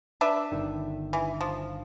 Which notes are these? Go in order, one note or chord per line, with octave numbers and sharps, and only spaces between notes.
D4 B4 E5
G1 D3 D#3
E3
F3